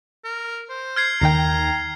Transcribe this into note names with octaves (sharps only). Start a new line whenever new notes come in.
A#4
C5
F6 G#6 C7
D#2 D#3 G5 A#5 C7